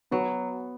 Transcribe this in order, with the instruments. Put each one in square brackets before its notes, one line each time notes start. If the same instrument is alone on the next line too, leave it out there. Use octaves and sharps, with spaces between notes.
[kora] F#3 [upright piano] B3